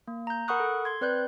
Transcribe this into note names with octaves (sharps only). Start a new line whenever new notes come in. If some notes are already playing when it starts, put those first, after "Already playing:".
A#3
A#5 G6
A#4 F#5 B5 C#6 D#6 F#6
A4
C6 G#6
C4 B4 D5 F#6 G6